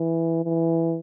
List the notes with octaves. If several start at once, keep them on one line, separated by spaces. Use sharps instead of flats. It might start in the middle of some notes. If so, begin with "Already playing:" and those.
Already playing: E3
E3